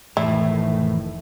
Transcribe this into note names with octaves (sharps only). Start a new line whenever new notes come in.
F1 A2 D#3 E3 A3 E4